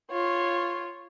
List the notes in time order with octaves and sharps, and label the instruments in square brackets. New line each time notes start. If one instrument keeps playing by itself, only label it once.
[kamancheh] F4 C#5